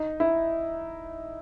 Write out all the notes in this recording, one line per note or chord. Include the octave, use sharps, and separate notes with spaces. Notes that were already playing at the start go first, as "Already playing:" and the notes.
Already playing: D#4
E4